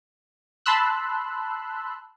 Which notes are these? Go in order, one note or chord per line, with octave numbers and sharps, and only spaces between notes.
A5 B5 C6 E6 F#6